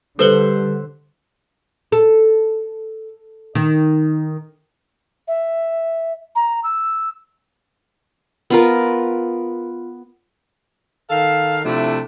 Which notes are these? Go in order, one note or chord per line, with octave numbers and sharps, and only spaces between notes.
D3 G3 A4 B4 C5 E5 F#5 G7
A4
D#3
E5
A#5
E6
B3 F4 A#4
D#3 A4 F5
C3 F3 A3 D4 E4